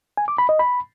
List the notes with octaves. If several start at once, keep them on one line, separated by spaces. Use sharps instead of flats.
G#5
D6
B5
D#5
B5